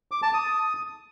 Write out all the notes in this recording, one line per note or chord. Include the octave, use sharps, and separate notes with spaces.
D6
A5
D#6